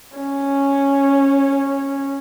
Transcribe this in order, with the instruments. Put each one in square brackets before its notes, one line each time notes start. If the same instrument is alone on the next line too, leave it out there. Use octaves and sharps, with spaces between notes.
[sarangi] C#4